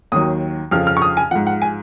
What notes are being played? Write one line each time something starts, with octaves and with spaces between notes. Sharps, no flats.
D#2 D#3 F#3 D#6
F2 C#3 F3 F6
F6
C#6
D#6
G#5
G#2 F3 F#5
F#5
G#5